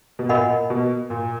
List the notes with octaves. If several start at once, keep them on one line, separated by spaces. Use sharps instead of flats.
B2
A#2 A#4 D#5 F#5 B5
B2
A#2